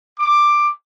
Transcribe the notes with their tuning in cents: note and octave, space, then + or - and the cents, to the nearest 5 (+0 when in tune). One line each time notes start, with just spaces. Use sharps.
D6 +10